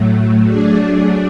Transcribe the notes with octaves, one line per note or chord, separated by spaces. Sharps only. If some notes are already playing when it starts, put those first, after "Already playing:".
Already playing: A2 F#3 A3
F#3 A3 D4 G#4 D5